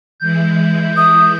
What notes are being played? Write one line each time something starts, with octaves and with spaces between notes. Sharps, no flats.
E3 G#3 E4 G6
D#6